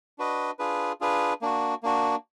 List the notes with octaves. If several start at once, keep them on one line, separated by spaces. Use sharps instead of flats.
D4 F#4 B4 D#5
D4 F4 G#4 B4
D4 F4 G#4 B4
A#3 D4 F#4
A#3 D4 F#4